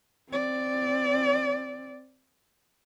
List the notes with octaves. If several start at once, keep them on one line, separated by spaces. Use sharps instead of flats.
C4 D5